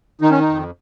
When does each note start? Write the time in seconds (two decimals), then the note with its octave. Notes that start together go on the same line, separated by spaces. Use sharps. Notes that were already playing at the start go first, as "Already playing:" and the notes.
0.21 D#3 D#4
0.31 C#4
0.39 D#4
0.48 F2